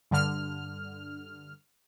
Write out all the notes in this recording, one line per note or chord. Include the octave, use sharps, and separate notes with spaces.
G2 D3 F6